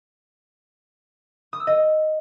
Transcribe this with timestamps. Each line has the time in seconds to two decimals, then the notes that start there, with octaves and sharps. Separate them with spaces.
1.53 D#6
1.60 E6
1.67 D#5